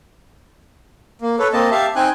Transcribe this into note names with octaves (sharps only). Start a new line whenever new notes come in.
A#3
A4 B4 C#5
A#3 C4 D#5 A5
G4 E5 F5 A5
C4 D#4 G5 G#5 F#6